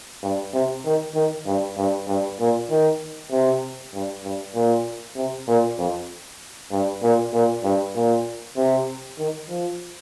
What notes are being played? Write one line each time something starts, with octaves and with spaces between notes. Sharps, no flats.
G2
C3
D#3
D#3
G2
G2
G2
A#2
D#3
C3
G2
G2
A#2
C3
A#2
F2
G2
A#2
A#2
G2
A#2
C3
D#3
F3